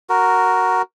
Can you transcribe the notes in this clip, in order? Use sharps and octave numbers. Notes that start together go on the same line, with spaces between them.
F#4 A#4